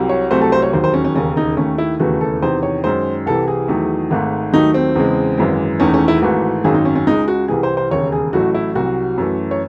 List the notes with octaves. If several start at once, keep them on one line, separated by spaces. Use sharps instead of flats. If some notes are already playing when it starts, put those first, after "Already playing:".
Already playing: C2 C3 F#3
C#5
C2 C3 F#3 A3 C5
A4
C5
C#5
E1 D#2 D#3 F#3 C5
C5
C#4
C#4
E1 D#2 C#3 C#4
D#4
D#2 D#3 A3 C#4
E4
E1 D#2 C#3 E3 A3 F#4
A4
E2 C3 D#3 C5
C#5
F#2 D#3 G#3 C5
C2 C3 E3 A4
G#4
E2 D#3 F#3 A3
G#1 G#2 D#3 A3
D#2 D#3 F#3 A3 D#4
C4
E2 C#3 G#3
G#1 F#2 E3 G#3
E1 E2 D#3 A3 C#4
C#4
E4
G#1 G#2 E3 A3 F#4
G#1 F#2 D#3 F#3 G#4
D#4
C#4
C#4
C#2 C#3 G#3 D#4
F#4
C2 C3 E3 G#4
C5
C5
E1 D#2 C#3 C#5
G#4
A1 A2 F#3 A3 F#4
E4
C2 C3 F#3 F#4
F#2 E3 A3
C#5